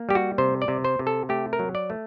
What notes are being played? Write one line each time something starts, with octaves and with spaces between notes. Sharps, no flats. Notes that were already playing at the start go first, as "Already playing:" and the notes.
Already playing: A#3
G3 G4
F#4
C3 C5
D5
C3
C5
C3
A4
A3 G4
A#4
F#3
D5
A3